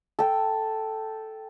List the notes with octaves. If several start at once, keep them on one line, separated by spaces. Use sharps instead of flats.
A4 G5